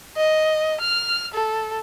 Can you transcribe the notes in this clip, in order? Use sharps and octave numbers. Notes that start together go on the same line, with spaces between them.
D#5
F6
A4